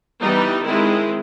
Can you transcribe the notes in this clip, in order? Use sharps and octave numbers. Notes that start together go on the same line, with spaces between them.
E3 G3 B3 D#4
D#3 G#3 C4 E4